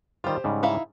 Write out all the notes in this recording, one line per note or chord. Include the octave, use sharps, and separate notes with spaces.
D#3 G3 F4 G4 C5
G#2 C#3 G3
D#4 E4 F5